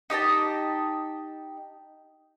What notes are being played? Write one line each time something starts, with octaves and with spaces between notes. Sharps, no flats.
D#4 G4 D#5 A5